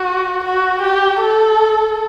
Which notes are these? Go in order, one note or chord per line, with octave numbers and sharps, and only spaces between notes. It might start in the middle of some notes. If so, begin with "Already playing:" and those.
Already playing: F#4
F#4
G4
A4